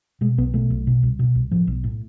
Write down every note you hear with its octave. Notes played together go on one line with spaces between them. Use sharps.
B2 G#3
B1 B3
B2 A3
B1
B2
C2
B2
C2
A2 F3
B1
A2